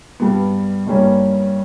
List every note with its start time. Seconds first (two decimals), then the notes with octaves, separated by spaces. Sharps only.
0.20 G2 G3 B3
0.86 G1 G2 G3 A#3 C#4